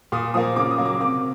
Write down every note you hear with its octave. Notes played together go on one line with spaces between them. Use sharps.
A#2 D#6
F3 A#3 D#6
C#3 D6
D#6
F#3 A#3
D6
C3 D6